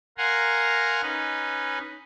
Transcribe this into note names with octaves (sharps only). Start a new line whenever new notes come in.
A#4 F5 F#5 G#5 A#5 C6
C#4 D#4 B4